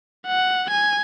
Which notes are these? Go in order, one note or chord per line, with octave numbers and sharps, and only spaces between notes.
F#5
G#5